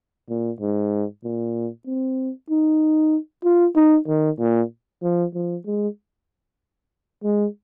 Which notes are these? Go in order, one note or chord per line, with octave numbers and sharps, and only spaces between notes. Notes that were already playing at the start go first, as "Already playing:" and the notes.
A#2
G#2
A#2
C4
D#4
F4
D#4
D#3
A#2
F3
F3
G#3
G#3